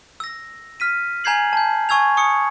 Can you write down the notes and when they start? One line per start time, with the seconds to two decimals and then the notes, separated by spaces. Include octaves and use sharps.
0.20 E6 A#6
0.80 F6 B6 D#7
1.24 G#5 A#5 G6 G#6 C7 F#7
1.53 A5 G6
1.89 G#5 C#6 E6 G#6 F7
2.17 C#6 D#6 C#7